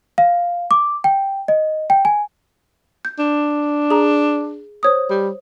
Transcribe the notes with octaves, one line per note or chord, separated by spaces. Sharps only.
F5
D6
G5
D#5
G5
G#5
G6
D4
G#4 A#5
C5 C#5 D#6
G3